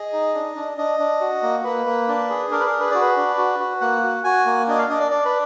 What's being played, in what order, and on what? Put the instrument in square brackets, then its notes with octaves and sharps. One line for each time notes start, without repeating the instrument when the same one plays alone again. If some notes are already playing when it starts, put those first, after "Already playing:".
Already playing: [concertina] G#4 D#5
D#4
D4
D4
D4 D#5
D4
F#4
A#3
A#3 B4
A#3
D4
G#4
D4 A#4
B4
A#4
G#4
B4
F#4 D5
B4
D4
F#4
F#4
A#3 F#5
F#4
F#4 G#5
A#3
D4 D#5
F5
D4 D#5
D5
D4 D5
B4